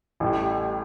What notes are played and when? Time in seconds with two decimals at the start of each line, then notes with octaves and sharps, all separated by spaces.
0.20 A1 A2 G3